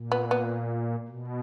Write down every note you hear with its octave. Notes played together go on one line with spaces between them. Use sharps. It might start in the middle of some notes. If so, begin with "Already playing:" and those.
Already playing: A#2
B3
B3
B2